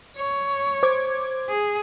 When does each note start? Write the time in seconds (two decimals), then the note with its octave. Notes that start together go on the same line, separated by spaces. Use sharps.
0.16 C#5
0.83 C5 D6 G#6
1.49 G#4